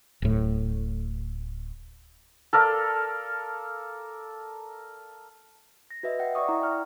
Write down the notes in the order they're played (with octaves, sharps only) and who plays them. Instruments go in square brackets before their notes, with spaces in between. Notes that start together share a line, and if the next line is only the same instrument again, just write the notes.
[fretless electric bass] D1 A2
[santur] A4 A#4 D5 F5
[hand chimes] A#6
F#4 B4 D#5 E5
E5 F#5 G5
D5 E5 C#6 D#6
E4 A#5
D5 G5 F6